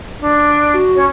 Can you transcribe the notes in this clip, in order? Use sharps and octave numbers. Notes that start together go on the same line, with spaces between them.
D4
F#4
C#4 C#5